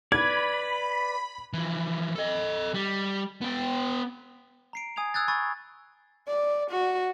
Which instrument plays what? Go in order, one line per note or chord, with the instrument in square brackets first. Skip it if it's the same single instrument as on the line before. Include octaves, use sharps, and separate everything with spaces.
[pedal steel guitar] B4 D5 [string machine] B5 [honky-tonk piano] G#6
[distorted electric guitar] E3 F3
A4 D#5
G3
B3 G5
[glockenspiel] A#5 C7 D7
G#5 D#6 G#6 C7 F7
D#6 E6 F#6 G#6 A6
G#5 B5 C#6 E6 G#6 A6
[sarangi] D5
F#4